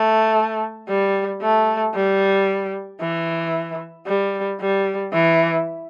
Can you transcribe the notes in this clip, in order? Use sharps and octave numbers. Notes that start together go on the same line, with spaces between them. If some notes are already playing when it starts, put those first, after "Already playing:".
Already playing: A3
G3
A3
G3
E3
G3
G3
E3